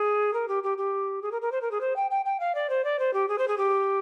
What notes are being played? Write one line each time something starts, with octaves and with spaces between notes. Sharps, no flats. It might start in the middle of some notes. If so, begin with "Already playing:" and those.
Already playing: G#4
A#4
G4
G4
G4
G#4
A#4
A#4
C5
A#4
G#4
C5
G5
G5
G5
F5
D5
C5
D5
C5
G4
G#4
C5
G#4
G4